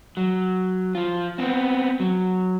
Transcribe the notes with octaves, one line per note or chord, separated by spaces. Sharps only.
F#3
F3 F4
B3 C4
F#3